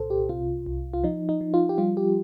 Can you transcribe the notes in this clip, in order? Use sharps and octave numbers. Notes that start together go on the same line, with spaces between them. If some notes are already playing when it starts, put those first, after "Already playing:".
Already playing: C2 A#2 A4 C5
G4
C3 F4
C2
F4
F3 D#4
D#4
F3
F4
G4
G3 F4
G4